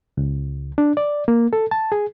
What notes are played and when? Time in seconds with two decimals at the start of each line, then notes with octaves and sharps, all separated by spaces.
0.17 C#2
0.78 D4
0.97 D5
1.28 A#3
1.53 A4
1.71 A5
1.92 G#4